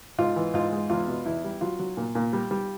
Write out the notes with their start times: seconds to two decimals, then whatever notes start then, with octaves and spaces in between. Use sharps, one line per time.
0.18 G#2 F4
0.36 E3
0.54 G#2 F4
0.72 G#3
0.90 E2 F4
1.08 B2
1.26 E2 E4
1.44 G3
1.61 F#3 F4
1.79 F#3
1.97 A#2
2.15 A#2
2.33 G3
2.51 G3